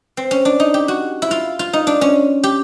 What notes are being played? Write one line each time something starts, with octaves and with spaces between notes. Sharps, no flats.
C4
C#4
D4
D#4
G4
F#4
E4
F4
F4
D#4
D4
C#4
G4